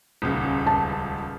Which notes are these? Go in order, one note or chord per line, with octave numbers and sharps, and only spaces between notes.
D#1 C#2 C#3
A5